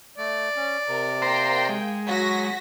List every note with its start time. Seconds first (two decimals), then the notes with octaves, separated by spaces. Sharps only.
0.18 A3 D5
0.56 C#4
0.88 C3 A#4
1.22 A#3 C5 G5 A#5 C6
1.69 G#3
2.08 F#3 F#4 A#6 B6